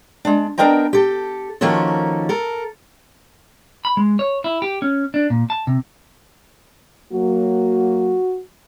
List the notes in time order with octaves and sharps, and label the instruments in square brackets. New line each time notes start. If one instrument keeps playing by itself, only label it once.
[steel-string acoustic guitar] G#3 D4
B3 D4 A#4 D#5 G5 A#5
G4 A4
D#3 F3 A#3 C#4 F#4 A4
A4 A#4
[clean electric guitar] B5
G#3
C#5
E4
G4
C#4
D4
A#2
A5
C3
[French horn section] F#3 A#3 [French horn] F#4